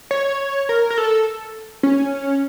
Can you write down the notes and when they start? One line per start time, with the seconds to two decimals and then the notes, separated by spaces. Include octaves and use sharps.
0.11 C#5
0.69 A#4
0.90 A#4
0.98 A4
1.83 C#4